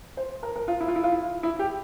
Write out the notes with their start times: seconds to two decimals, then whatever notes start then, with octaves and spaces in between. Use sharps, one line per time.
0.17 C5
0.43 A#4
0.56 A#4
0.68 F4
0.81 E4
0.88 F4
0.96 E4
1.04 F4
1.12 E4
1.43 E4
1.59 G4